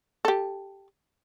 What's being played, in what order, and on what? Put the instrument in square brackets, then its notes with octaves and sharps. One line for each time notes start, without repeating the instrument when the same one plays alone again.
[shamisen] G4 A4